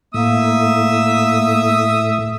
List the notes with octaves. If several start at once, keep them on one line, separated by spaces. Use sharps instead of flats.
A2 A#3 E5 D#6 E6